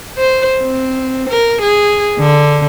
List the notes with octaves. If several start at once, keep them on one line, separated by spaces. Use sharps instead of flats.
C5
C4
A#4
G#4
D3